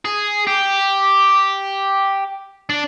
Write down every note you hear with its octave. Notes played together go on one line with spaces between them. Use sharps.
G#4
G4
D4